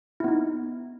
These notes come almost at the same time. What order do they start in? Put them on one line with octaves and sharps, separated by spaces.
E4 B3 D#4